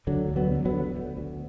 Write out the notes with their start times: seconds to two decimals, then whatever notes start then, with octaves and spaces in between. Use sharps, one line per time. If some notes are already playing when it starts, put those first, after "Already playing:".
0.07 D2 D3 F#3
0.29 D2
0.36 F#3 B3
0.51 D3
0.65 F#3 B3
0.74 D3
0.96 D2
1.17 D2